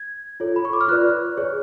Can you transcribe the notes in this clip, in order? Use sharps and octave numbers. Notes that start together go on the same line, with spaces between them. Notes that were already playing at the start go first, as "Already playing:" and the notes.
Already playing: G#6
F4 A4 C#5
B5
C#6
D6
F6
F4 B4 D5 F#6
G#4 C#5